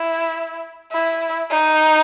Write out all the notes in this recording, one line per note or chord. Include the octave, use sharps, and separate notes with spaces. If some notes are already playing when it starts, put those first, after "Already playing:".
Already playing: E4
E4
D#4